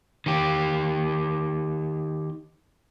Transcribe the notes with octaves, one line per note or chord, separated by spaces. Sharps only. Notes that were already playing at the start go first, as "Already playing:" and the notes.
D#3 G4